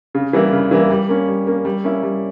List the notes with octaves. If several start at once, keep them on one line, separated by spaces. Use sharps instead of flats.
C#3
E3 G3 A#3 E4
C#3
E3 G3 A#3 E4
G3
A#3 C#4
G3
A#3 C#4
G3
A#3 C#4 E4
G3